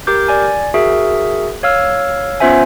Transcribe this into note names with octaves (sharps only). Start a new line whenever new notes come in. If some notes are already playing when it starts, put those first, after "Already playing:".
G4 A#4 D6 G6
D5 G#5
F#4 G#4 A#4 E5
C#5 F5 E6 F6
B3 C#4 F4 C5 E5 G#5